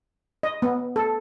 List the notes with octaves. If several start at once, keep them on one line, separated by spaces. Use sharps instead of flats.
D#5
B3
A4